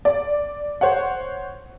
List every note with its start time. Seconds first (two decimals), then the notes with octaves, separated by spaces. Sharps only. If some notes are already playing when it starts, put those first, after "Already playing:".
0.05 D5
0.81 C5 C#5 F#5